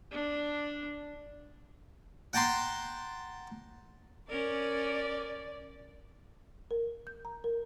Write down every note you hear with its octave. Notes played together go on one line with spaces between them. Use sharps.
D4
F#5 G5 A5 A#5 C6
C#4 A#4 D5
A#4
G6
A#5
A#4